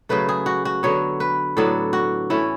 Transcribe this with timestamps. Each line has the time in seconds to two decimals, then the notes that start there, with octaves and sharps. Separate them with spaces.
0.09 C#3 F#3 A3 B4
0.29 G#4
0.46 F#4
0.65 F#4
0.83 D3 F#3 B3 C#5
1.20 B4
1.57 A2 F#3 B3 D4 A4
1.93 F#4
2.30 E3 A3 C#4 E4